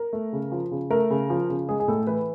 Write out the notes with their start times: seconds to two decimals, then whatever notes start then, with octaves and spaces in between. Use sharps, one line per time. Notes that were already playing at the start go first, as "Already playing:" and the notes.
Already playing: A#4
0.13 A3
0.33 C#3
0.52 F3
0.71 C#3
0.90 A3 A#4
1.10 C#3
1.30 F3
1.50 C#3
1.69 G#3 G#4
1.80 G#4
1.88 A2 A4
2.07 E3 B4